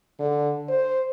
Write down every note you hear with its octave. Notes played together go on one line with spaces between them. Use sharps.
D3
C5